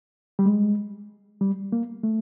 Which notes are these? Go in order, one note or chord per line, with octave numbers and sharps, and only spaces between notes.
G3
G#3
G3
A#3
A3